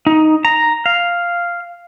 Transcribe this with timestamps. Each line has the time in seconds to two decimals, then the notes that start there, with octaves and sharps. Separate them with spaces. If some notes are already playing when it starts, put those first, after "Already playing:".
0.07 D#4
0.45 A#5
0.86 F5